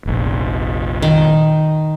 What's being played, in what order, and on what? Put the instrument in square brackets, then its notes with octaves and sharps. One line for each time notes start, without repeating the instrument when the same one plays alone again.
[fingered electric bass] F1 A#1
[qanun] D#3